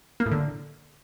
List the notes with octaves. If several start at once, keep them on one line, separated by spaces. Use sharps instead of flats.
A#3
A2
D3